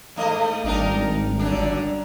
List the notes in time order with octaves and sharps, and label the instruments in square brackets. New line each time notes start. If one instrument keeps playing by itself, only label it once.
[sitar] G#2 A3 D#5
[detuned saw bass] G#1 [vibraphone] G3 D5 A#5 [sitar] D4 D#4 A#4
[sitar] F#2 D3 D4